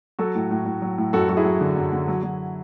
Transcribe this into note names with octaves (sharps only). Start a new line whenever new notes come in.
F#3 F#4 A4
A2
A2
A2
F#3
A2
F#2 F#4 A4
F#3 F#4
E4 G#4
F#3
D3
F#2
D3
F#3
F#3